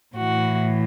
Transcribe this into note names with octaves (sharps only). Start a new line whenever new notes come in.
A2 E3 F#4